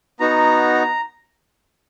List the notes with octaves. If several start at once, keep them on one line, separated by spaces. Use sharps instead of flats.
B3 D#4 F#4 A#5